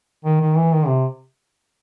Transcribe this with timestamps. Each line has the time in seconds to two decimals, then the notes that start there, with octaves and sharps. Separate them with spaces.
0.25 D#3
0.41 D#3
0.56 E3
0.72 D#3
0.88 C3